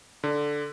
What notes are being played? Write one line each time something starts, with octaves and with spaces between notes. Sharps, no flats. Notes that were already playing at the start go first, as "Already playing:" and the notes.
D3